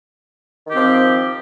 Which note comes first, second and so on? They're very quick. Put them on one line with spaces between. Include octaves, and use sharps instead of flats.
D#3 G4 C4 F3